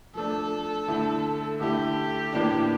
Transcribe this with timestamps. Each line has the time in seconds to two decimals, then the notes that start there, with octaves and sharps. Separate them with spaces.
0.15 F3 A3 D4 A4
0.88 D3 A3 E4
1.60 D3 A3 E4 G4
2.33 A2 E3 A#3 D4